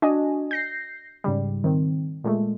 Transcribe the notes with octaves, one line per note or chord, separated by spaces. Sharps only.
D4 F#4 D#5 G#5
G6 A#6 C7
G#2 C#3 G3
D#3 C4
A#2 G#3 A3